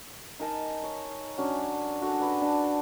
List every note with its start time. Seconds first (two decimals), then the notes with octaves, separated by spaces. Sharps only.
0.39 D#4 A#4 G#5 A5
0.84 C#5
1.38 F#3 C#4 D4
2.02 D4 F#4 A4
2.20 G#4 B4 D5
2.42 D4 A5